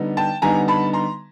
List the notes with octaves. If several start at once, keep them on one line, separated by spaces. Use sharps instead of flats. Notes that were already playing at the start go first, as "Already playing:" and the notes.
Already playing: D3 G3 B3 D#4
G5 A5
D3 G3 B3 D#4 G#5 A#5
A5 B5
A#5 C6